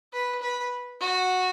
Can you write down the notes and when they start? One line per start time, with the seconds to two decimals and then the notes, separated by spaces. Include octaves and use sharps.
0.13 B4
0.42 B4
1.01 F#4